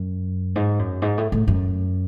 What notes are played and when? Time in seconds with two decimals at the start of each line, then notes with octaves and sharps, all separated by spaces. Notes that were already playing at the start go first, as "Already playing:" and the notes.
Already playing: F#2
0.56 G#2
0.79 F#2
1.02 G#2
1.18 A2
1.32 A2
1.48 F#2